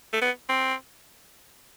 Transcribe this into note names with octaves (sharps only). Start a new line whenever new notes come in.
A3
B3
C4